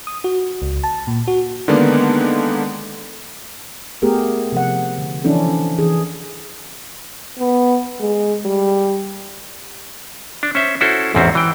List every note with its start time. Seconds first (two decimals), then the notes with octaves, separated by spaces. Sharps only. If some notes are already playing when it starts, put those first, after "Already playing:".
0.07 D#6
0.24 F#4
0.62 C#2
0.84 A5
1.07 A#2
1.27 F#4
1.68 D3 D#3 G#3 A#3 B3 D4
4.02 A3 B3 G4 G#4 A#4
4.52 C3 F3 F#5
4.98 D3
5.24 E3 F3 C#4 D4 E4 A4
5.78 E3 G#4
7.39 B3
8.00 G#3
8.45 G3
10.43 D4
10.55 C#4 C5 E5
10.81 C#4 E4 F#4 A4 C5
11.15 A1 E2 G#2 C4 C#4 C5
11.35 E3 G5